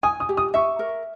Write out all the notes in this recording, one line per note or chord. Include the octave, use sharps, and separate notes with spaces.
G#5 D#6
D#6
G4
D#6
E5 C#6
A#4